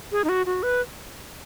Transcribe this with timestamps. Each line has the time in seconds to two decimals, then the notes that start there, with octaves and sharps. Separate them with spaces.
0.12 G#4
0.24 D#4
0.29 F#4
0.46 F#4
0.63 B4